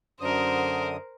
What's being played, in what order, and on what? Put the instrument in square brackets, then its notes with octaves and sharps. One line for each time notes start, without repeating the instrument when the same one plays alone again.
[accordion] F#2 D3 D#6 [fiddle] A#4 C5